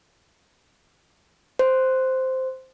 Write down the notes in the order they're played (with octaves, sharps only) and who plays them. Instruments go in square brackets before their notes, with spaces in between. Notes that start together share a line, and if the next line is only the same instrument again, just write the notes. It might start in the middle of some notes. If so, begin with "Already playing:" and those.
[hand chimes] C5